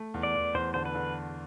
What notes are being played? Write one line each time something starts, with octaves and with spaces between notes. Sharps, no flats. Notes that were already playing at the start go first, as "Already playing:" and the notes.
Already playing: A3
E2
D5
E2
E2 C5
D3 C5
B4
D3